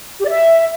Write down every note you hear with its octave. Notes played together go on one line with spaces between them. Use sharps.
G4
D5
E5